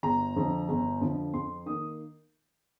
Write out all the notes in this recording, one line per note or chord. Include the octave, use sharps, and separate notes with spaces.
G1 A#5
F2 D3 F3
G1
F2 D3 F3
F2 C6
D#3 A#3 D#6